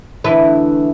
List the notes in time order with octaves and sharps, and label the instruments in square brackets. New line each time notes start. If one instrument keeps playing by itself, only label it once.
[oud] D2 E3 B4